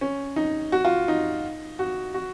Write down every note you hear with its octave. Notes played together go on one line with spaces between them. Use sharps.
C#4
D#4
F#4
F4
D#4
F#4
F#4